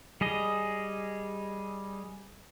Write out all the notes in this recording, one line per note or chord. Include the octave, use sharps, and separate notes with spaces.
G3 G#4 D#5